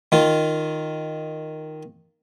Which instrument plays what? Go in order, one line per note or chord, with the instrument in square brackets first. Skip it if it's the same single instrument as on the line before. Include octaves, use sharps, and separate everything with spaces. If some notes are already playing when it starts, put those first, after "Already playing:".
[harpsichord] D#3 F4